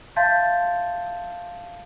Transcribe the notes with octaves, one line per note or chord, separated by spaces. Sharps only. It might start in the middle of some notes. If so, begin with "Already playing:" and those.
E5 F5 A5 C6 G6 A6